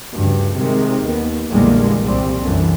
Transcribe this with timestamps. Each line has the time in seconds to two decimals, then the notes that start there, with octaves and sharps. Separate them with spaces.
0.13 D2 G2 C#3
0.57 C3 D#3 G#3
1.04 D#2 B3
1.50 A#1 E2 D3 G3 G#3 A#3
2.02 C2 A#2 G3 C4
2.42 C2 F#2 D3 E3